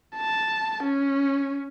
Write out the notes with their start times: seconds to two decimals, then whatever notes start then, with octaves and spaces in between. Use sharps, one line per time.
0.16 A5
0.84 C#4